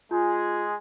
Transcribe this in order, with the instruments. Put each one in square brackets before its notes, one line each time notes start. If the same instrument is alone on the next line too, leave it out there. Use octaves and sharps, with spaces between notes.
[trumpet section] G#3 G#4 [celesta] F4 G6